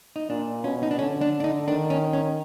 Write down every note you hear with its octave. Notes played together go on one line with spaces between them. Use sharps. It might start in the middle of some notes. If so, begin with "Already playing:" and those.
D#4
A#2 D4
B2 C#4
D#4
D4
D3 C#4
D4
D4
D#4
D#3 D4
C#4
C#4